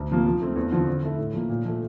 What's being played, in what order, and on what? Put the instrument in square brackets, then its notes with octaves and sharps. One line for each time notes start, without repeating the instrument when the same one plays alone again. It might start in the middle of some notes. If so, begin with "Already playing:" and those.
Already playing: [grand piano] D2
C3 F3 A#3
F3
A3 C4
E2
D3 F3 C4
D3
A3 E4 A4
A2
F3 A#3
A#2
F3 A3